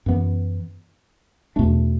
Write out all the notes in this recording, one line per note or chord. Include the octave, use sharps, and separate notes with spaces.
F#2 E3 B3
E2 B2 A3 D4